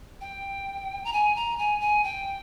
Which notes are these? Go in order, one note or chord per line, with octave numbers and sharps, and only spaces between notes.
G5
A#5
G#5
A#5
G#5
G#5
G5